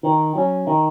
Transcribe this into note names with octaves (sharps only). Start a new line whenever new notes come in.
D#3
F#3 C#4
D#3